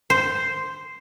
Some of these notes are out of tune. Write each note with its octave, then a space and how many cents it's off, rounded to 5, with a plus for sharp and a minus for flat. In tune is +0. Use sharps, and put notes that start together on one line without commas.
C5 -5